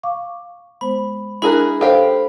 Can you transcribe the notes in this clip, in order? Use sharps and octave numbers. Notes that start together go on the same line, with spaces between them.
F5 C#6 D6
G#3 B3 C5 B5
D4 E4 G#4 A#4 B5 F#6
G4 A4 C5 F5 G5